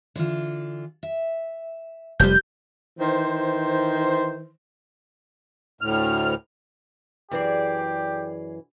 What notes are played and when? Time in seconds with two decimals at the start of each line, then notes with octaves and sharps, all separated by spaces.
0.16 D3 E3 F4
1.03 E5
2.20 F1 F2 G3 G4 B4 C5 G6
3.00 D#3 E3 C5
5.81 D2 A2 F6
7.31 F#2 E3 G4 G#4 D5